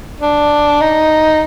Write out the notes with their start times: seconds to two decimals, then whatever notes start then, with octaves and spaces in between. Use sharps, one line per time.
0.20 D4
0.81 D#4